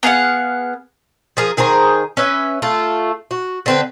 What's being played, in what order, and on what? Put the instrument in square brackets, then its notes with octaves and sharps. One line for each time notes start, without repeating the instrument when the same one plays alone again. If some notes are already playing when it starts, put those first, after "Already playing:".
[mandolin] B3 G#4 F5 F#5
[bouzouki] F3 G#4 A#4
D#3 G#4 C5 A#5
C#4 B4 E5
A3 F4
F#4
D3 C4 B4